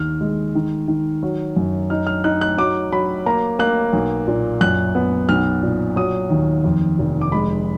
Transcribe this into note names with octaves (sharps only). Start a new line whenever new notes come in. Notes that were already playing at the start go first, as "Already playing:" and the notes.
Already playing: D#2 F6
G#3
D#3
D#3
F#3
F#2
D#4 F6
F6
D#4 F#6
F#6
F#3 D6
F#3 B5
A#3 A#5
A#3 F#6
B1
A#2
F#2 F#6
B3
B1 F6
A#2
F#3 D#6
D#2
F2
F1
D6
G#3 B5